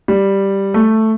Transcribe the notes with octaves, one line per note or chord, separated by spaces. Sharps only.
G3
A3